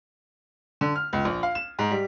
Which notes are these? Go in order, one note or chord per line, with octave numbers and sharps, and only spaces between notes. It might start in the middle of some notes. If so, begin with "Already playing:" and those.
D3
F6
C#2
A#1
F5
E7
G#2
G3